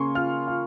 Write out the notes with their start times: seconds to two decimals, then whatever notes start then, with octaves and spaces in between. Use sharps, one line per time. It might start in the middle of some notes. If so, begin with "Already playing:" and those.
Already playing: C#3 A#3 G#5 C6 C#6
0.15 F4 F6
0.47 F4